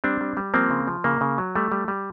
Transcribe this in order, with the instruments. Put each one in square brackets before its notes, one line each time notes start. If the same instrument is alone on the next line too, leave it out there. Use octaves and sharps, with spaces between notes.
[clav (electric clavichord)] G3 C4 D4
G3
G3
F3 A#3 C4
C#3
F3
C#3 A#3
C#3
F#3
G3 A3
G3
G3